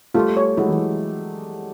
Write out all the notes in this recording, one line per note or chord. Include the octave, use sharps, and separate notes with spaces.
G3 A3 F4
C#5
F#3 G#3 E4
E3 F#3